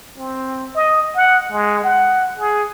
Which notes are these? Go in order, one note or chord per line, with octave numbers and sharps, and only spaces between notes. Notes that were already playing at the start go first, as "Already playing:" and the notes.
C4
D#5
F#5
G#3
F#5
G#4